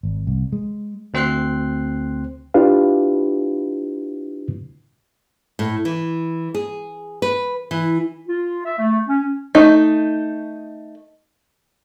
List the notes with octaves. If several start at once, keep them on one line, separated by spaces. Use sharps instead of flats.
G#1
C2
G#3
D2 C4 C5 C6 F#6 C7
D4 E4 F4 G4 B4 F5
A2
E3
G#4
B4
E3
F4
E5
A3
C#4
A3 D#4